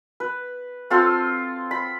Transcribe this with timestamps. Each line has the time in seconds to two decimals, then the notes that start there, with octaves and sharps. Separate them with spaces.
0.20 B4
0.90 C4 F4 A4 C6
1.71 B5